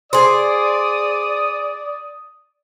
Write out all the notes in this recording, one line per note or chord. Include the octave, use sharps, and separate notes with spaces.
G#4 C5 D5 D#6